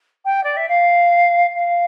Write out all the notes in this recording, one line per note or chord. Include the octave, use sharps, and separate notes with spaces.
G5
D5
E5
F5
F5